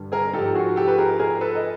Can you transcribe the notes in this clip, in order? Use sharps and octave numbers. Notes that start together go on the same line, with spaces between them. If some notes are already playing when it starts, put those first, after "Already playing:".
Already playing: G2 D3 G3
G#4 A#4
G#2 F3 G4 A4
F#4 G#4
G4 A4
B4
G#4 A#4
G#4 A#4
A4 B4
D#5